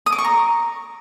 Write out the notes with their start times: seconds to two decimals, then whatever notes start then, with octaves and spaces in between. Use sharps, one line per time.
0.06 D#6
0.12 D6
0.18 C#6
0.24 A#5